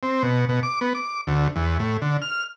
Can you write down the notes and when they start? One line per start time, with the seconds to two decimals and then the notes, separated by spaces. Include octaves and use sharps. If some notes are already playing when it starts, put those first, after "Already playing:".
0.03 C4
0.23 B2
0.49 B2
0.63 D6
0.81 B3
0.95 D6
1.27 D2
1.56 E2
1.80 A2
2.02 D3
2.22 F6